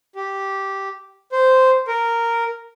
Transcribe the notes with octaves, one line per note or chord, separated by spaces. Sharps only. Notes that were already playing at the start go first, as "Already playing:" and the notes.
G4
C5
A#4